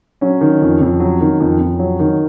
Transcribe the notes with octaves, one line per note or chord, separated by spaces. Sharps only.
F#3 C#4
D#3
F2
F2
F#3
D#3
F2
F2
F#3
D#3